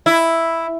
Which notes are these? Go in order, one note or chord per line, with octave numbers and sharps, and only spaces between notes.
E4